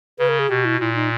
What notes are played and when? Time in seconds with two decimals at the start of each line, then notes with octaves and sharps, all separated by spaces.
0.19 C#3 B4
0.29 A#4
0.39 G#4
0.49 B2 G4
0.65 E4
0.80 A#2 E4
0.95 D#4